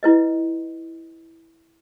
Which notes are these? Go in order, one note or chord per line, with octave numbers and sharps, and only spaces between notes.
E4 B4 D#5